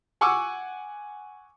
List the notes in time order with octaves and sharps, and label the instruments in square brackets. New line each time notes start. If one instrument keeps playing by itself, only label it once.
[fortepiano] F#5 G#5 C#6 D6 E6